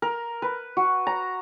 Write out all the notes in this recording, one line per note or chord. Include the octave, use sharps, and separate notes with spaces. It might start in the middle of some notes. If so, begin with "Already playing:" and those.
A#4
B4
F#4
A#5